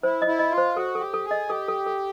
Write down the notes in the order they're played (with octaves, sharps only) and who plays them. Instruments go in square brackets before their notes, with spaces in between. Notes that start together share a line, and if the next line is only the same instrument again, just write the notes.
[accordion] E4 [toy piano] C5
[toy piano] D#5
[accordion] E4
[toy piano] D#5
[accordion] F4
[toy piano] C5
[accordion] F#4 [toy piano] A4
[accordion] G4 [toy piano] A4
[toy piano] A4
[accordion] G#4
[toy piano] D#5
[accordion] G4 [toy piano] A4
[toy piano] A4
A4